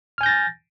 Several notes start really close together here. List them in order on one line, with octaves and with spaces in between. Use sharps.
F6 G#5 G6 A#6 A6